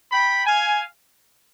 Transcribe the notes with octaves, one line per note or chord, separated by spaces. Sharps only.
G5 B5
F5 G#5